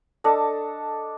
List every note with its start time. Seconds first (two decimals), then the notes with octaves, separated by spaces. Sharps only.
0.24 D4 A4 D#5 A5